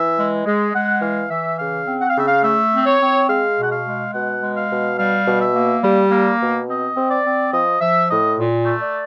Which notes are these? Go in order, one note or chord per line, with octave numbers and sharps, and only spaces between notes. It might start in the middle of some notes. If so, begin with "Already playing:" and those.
Already playing: E3 E5
G#3
G#3
G#3 F#5
E3 F5
E3 E5
C#3 F5
C4
F#5
F5
C#3 E5
F5
A3 E5
C4
C#5
C4
G#3 F5
B2
F#5
F5
G#3
B2 F#5
G#3
F5
B2
G3 F5
B2
E5
A#3
G3
A#3
B2
C4 D#5
C4
D5
C4
F3 D#5
F3 E5
A2 D#5
A#2
A3
D5